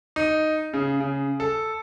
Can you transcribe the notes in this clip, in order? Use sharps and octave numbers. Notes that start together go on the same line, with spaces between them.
D#4
C#3
C#3
A4